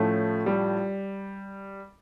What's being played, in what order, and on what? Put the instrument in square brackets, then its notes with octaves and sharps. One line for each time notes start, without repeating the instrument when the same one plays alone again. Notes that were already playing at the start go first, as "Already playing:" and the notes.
Already playing: [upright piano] A2 F3 C#4 [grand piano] A3
[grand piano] G3